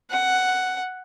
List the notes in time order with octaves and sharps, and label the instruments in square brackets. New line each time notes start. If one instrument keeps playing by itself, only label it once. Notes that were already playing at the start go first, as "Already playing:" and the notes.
[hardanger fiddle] F#5